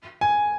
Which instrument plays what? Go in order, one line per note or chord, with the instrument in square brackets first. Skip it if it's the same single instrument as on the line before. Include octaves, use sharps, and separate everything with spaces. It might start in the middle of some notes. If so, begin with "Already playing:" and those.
[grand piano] G#5